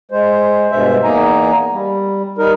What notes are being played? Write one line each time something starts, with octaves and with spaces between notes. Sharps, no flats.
G#3 C5
G2 B2 G#3 C5 E5
E2 A#3 D#4 G#5 A#5
G3
G3 D#4 A#4